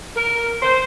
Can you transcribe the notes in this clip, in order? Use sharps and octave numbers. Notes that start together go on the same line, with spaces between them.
A#4
C5